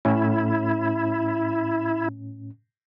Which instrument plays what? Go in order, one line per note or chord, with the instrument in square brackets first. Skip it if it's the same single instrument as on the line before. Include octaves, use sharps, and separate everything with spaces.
[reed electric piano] A2 C#4 [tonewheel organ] E4